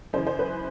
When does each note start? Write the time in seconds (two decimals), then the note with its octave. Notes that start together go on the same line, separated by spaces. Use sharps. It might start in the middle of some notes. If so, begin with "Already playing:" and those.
0.13 F#2 C#3 E3 C5
0.27 C5
0.39 B4